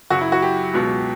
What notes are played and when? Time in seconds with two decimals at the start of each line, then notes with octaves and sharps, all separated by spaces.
0.10 F#2 C#3 F#3 F#4
0.21 E4
0.32 F#4
0.42 G4
0.74 C#2 B2 F#3